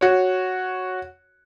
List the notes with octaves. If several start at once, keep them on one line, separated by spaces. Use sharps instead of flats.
F#4 C#5